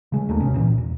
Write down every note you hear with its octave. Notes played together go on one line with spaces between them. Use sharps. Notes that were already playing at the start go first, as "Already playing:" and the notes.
C#3 G#3
D#2 A3 A#3
G#1 C3 B3 C#4
C#2 A#2 E3
E1